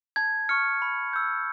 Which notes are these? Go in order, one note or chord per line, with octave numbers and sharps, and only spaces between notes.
A5 G#6
C#6 F6 C#7
B5
E6 G6